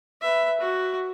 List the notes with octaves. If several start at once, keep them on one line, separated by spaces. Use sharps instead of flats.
B4 E5
F#4